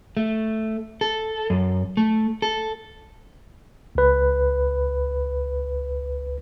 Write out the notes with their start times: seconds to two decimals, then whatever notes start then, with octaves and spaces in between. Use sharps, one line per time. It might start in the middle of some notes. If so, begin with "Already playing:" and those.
0.17 A3
1.01 A4
1.50 F#2
1.97 A3
2.42 A4
3.95 C#2 B4